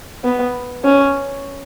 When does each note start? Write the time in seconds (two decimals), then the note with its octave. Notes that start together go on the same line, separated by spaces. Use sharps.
0.24 B3
0.84 C#4